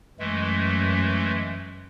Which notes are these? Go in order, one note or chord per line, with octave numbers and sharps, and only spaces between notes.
F#2 E3 G#3 A3